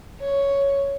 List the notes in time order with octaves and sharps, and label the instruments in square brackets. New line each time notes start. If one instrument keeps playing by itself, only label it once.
[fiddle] C#5